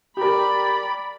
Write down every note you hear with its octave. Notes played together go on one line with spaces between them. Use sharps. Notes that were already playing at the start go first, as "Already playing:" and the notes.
G4 A#4 D5 B5